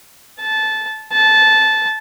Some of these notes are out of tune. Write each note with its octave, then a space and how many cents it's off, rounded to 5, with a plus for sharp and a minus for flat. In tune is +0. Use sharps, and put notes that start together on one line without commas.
A5 -15
A5 -15